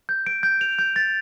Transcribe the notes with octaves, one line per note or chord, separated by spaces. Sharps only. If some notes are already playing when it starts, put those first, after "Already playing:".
G6
D7
G6
F7
G6
A6